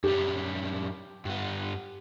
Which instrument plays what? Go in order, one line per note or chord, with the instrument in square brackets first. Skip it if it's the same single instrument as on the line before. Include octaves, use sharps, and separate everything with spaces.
[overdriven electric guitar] F#2 G3 [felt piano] G4
[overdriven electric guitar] G2 B3